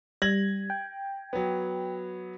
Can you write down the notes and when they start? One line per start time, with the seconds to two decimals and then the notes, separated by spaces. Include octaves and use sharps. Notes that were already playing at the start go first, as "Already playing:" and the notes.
0.22 G3 G#6 A#6 F#7
0.70 G5
1.33 F#3 B3